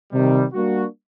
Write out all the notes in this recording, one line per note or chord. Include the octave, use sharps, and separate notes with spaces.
C3 D#3 G3
G3 A#3 D4 F#4